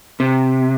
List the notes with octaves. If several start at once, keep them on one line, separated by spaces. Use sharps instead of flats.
C3